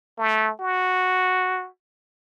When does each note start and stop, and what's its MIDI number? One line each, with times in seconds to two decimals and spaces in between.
0.18 0.52 57
0.60 1.68 66